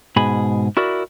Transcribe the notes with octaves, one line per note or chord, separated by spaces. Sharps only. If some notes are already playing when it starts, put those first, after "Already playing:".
G#2 B2 G#4 B5
E4 F#4 A#4 D5